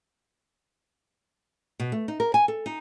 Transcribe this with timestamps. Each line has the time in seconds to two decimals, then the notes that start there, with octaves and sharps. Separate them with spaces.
1.80 B2
1.92 A3
2.08 D#4
2.20 A#4
2.34 G#5
2.48 A4
2.66 D#4